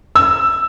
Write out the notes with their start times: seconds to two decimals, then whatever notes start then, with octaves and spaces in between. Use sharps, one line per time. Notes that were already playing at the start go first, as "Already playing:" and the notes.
0.15 E6